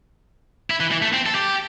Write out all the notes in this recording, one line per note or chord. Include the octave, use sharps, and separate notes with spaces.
E4
E3
E3
A3
C4
A4
G4